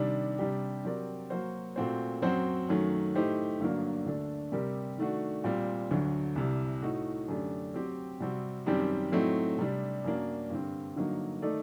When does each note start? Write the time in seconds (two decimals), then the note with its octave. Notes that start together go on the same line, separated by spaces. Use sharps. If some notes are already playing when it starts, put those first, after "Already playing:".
Already playing: C3 D#3 G3 D4
0.39 C3 G3 D4 G4
0.85 F#3 C4 G4 A#4 D5
1.30 F#3 A#3 F#4 C5
1.76 A#2 A3 C4 F#4 C5
2.22 F#2 F#3 C4 F#4 C5
2.69 F#2 D#3 F#3 A3
3.14 A2 A3 D#4 G4 C5
3.60 G2 D3 F#3 A#3 D4
4.06 D2 D3 A3 D4 A4
4.52 C3 G3 C4 G4 A#4
4.98 D#3 A3 D4 F#4
5.44 A#2 G3 C4
5.91 D2 D3 F#3
6.36 C2 C3 G3
6.82 A2 A3 D#4 F#4
7.28 F#2 D3 A3 D4 G4
7.74 F#3 C4 G4
8.20 C3 G3 C4 F#4
8.66 F#2 D#3 G3 C4 G4
9.12 A2 F#3 A3 C4 D#4
9.58 C3 G3 D4
10.04 F#2 F#3 A#3 D4
10.50 G2 D3 G3 C4
10.96 G2 D3 F#3 A#3 D#4
11.42 D#3 A3 D#4 A4 D5